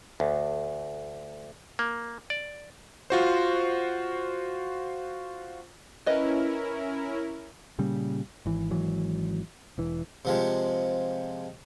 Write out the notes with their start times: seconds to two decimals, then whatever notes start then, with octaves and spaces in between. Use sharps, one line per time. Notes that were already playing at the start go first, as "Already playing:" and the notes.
0.20 D2
1.79 A#3
2.30 D5
3.10 F4 F#4 C5
6.06 C#4 E4 A#4 B4 D#5
7.79 A#2 C#3 G3
8.46 G#1 E3
8.71 G#1 E3 F#3
9.78 E1 E3
10.25 C3 F3 G#3